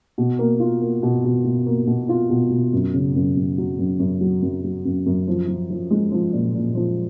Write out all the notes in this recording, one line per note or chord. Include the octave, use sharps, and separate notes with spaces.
B2
A#3
F4
A#3
B2
B2
B2
A#3
B2
F4
B2
B2
F#2
C#3
F#2
F#2
F#3
F#2
F#2
F#3
F#2
F#3
F#2
F#2
F3
F3
F3
G#3
F3
A#2
A#2
F3